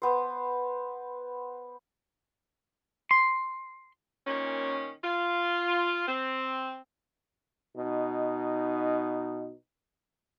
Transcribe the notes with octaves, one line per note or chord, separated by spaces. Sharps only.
B3 C5
C6
A#2 D#3 C#4
F4
C4
B2 D#4